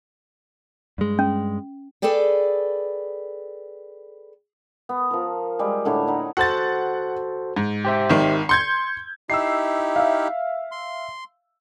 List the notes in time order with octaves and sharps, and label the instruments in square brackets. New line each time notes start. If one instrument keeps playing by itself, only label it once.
[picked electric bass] G2 G#3
[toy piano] C#4
[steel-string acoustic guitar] G#4 A4 B4 D5 G5
[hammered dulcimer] B3
F3 A#4
G3 G#3
A2 D3 B4 C#5
D#4 B4 F#5 A#5
[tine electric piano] F#4 A4 C5 [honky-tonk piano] F#5 A6
[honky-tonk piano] G#2
[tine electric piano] G4 C5 E5
[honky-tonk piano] G#1 D#3
[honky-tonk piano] C6 G6 G#6 [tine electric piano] C#7
[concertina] D#4 E4 G4 [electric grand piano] E6 C7
[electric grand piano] E5 F5
[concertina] C6